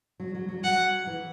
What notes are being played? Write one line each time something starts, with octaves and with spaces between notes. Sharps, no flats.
F#3
F#3
F#3
F#3 F#5
E3